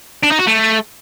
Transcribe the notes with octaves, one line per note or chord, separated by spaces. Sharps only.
D4
D#4
F#4
A3